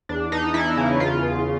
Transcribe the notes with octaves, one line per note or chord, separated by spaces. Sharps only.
E2 D4
E2 D#4
E3 E4
C#3
E2 F4
E2